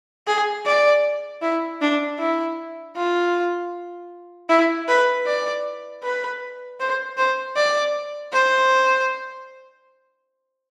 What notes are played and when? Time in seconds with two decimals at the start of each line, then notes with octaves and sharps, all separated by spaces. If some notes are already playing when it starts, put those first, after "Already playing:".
0.27 G#4
0.66 D5
1.42 E4
1.81 D4
2.19 E4
2.96 F4
4.49 E4
4.88 B4
5.26 D5
6.03 B4
6.80 C5
7.17 C5
7.56 D5
8.33 C5